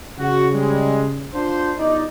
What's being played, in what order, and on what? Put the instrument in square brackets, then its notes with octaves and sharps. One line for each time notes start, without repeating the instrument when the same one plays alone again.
[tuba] C#3 [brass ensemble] F#4
[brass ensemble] G3 G#3
D4 F4 C5
G1 D#4 D5